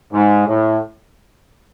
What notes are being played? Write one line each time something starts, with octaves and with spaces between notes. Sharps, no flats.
G#2
A2